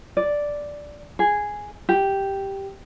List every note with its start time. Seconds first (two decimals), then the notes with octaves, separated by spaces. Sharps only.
0.17 D5
1.19 G#4
1.89 G4